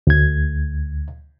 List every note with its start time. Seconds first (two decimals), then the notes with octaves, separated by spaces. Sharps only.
0.07 D2 G#6